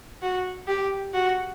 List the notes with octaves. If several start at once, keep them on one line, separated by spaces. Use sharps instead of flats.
F#4
G4
F#4